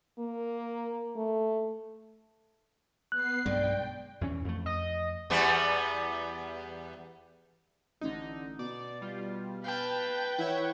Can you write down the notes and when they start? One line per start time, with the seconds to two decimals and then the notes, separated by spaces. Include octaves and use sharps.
0.19 A#3
1.16 A3
3.12 B3 F#6 C7
3.46 B1 G2 G#3 D5 G5
4.21 E2 E3 C#4
4.44 F2 A3
4.66 D#5
5.30 E2 G3 B3
8.01 A1 D3 D#4
8.59 B2 D5
9.02 G3 F4
9.64 B4 F5 G5 A5
10.39 E3 C#5 E5 F#5